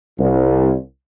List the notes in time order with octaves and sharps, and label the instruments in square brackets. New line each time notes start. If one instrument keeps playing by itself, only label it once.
[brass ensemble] C2